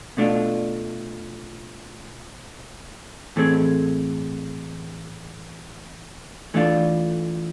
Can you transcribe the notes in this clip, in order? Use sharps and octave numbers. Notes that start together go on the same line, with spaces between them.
B2 A3 D4 F4
A2 E3 A3 C4 G#4
E3 A3 D4 F4